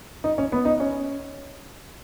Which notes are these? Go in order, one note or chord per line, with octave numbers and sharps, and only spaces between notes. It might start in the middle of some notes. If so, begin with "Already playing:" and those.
D#4
C#4
B3
D#4
C#4